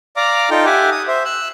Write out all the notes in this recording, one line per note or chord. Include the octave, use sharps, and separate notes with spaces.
D5 F5 A#5 D6
D#4 F4 A4 G5
G4 E5 F#5 G#5 D6
D#6
C5 E5
E6 F#6